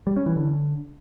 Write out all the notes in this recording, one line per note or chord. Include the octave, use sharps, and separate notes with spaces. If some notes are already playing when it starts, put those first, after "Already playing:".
G3
C#4
E3
D3